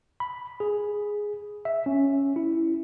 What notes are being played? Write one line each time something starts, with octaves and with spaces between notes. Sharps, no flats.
B5
G#4
E5
C#4
E4